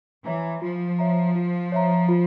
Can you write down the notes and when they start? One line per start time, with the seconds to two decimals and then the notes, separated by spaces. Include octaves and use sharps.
0.25 E3 C#5 E5 A#5
0.62 F3 F4
0.99 C#5 E5 A#5
1.35 F4
1.72 C#5 E5 A#5
2.09 F4